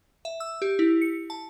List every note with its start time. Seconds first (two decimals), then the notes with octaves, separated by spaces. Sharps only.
0.25 E5
0.40 E6
0.62 G4
0.79 E4
1.02 C#7
1.30 A5